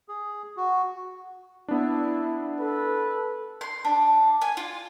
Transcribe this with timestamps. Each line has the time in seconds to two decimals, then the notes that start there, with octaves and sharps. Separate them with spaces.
0.08 G#4
0.57 F#4
1.68 B3 D4 E4
2.59 A4 B4
3.61 C6
3.85 D4
4.42 G#5
4.57 F4